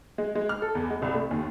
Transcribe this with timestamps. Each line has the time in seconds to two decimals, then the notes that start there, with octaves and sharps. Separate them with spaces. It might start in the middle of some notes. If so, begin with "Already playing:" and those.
0.18 G#3
0.35 G#3
0.49 F6
0.62 A4
0.75 E2
0.90 G#3
1.02 C2
1.14 A3
1.31 D#2